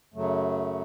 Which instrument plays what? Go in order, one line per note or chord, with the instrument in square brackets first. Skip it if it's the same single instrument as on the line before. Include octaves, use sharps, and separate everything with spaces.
[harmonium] F#2 C#3 F#3 A3